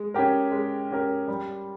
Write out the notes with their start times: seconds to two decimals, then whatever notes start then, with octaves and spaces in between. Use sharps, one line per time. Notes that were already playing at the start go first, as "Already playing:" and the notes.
Already playing: G#3
0.14 C#4 G4 A#4
0.52 G#3
0.90 C#4 G4 A#4
1.28 G3